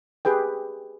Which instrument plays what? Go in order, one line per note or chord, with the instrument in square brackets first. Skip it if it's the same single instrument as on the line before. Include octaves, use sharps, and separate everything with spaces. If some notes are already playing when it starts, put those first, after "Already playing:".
[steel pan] G4 G#4 B4 G5